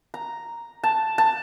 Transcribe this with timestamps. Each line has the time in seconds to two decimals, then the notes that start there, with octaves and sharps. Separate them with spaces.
0.14 A#5
0.84 A5
1.18 A5